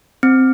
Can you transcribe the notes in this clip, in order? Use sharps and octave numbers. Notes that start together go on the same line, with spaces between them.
C4